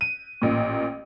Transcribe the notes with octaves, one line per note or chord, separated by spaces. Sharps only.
D#7
A1 A#2